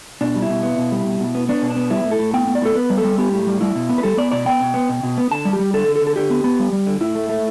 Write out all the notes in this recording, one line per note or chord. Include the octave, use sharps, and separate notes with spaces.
B2 D4
G3
E4
B2
B3
B2
G3
B2
B2
B3
B3 D4
B2
D4
B3
G3 E4
A2
A4
A2
B3 G5
B3
D5
A2 A4
B3 B4
G3
A4
G3
B3 G4
A2
G3
G3 E4
B2
B3
B4
G3 A4
B3 D5
B2 D5
B3 G5
B2
B3
B2
B2
B3
D3 A5
G3
G4
G3
D3 A4
D3
A4
D3
A4
D3 G4
B3
B3
G3
G3
D3
A2 E4
A3
A3